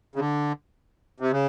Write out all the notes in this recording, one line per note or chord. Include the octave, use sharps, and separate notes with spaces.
C#3
D3
C3
C#3